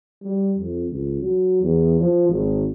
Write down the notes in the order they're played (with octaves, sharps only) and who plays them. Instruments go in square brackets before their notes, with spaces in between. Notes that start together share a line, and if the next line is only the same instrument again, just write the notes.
[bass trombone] G3
F2
C#2
F#3
E2
F3
G#1